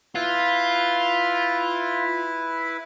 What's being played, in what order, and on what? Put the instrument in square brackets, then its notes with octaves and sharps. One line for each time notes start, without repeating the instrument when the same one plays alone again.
[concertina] E4 B4 [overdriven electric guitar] F4